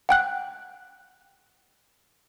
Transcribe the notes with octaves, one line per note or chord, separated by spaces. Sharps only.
F#5 G5 F#6